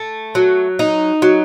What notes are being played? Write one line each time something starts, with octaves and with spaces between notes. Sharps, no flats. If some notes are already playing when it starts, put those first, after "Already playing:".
Already playing: A3
F#3
D#4
F#3